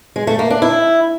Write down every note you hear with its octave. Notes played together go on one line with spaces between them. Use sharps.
G#3
A3
A#3
D4
E4